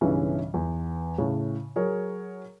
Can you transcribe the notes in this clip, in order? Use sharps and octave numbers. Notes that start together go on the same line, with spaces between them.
B1 G2 C#3 E3 C#4 E5
E2
A2 C#3
F#3 G#4 A#4 C#5